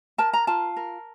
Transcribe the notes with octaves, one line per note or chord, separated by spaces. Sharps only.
A#4 A5
A#5
F4 A5
A#4